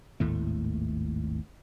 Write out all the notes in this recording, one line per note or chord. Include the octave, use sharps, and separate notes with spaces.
G#1 D#2 A2 A3